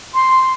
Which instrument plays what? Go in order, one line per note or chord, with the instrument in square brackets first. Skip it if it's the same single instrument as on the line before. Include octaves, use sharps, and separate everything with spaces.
[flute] C6